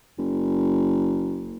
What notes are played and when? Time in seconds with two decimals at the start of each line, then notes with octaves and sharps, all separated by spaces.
0.18 F#1